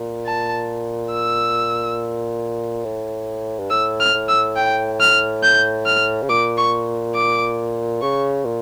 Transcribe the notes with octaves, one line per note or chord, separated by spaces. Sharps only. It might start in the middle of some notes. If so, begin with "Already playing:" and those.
Already playing: A#2
A5
E6
A2
G2
A2 E6
F6
A2
E6
G5
F6
G6
F6
C#3
A#2 D6
C#6
D6
C#3 C#6
A#2